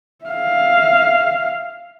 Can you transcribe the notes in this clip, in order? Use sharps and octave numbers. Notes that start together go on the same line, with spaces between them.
E5 F5